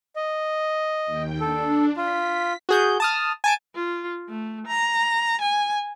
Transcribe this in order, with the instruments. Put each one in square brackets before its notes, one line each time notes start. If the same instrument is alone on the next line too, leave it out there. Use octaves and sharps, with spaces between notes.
[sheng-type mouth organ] D#5
[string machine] D#2 G5
[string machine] D4 [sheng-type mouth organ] A4
[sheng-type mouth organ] F4 [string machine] B6
[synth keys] F#4 G#4 G6
A5 D#6 F6
G#5 A5 D7
[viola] F4
A3
A#5
G#5